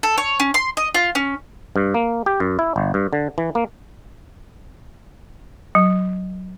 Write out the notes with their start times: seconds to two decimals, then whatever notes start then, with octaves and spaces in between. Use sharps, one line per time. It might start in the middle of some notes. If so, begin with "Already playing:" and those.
0.03 A4
0.18 C#5
0.40 C#4
0.54 C6
0.77 D#5
0.94 F4
1.15 C#4
1.76 G2
1.94 A#3
2.26 G4
2.40 F#2
2.59 E4
2.76 G1
2.94 G2
3.13 D3
3.38 E3
3.55 A#3
5.75 F#3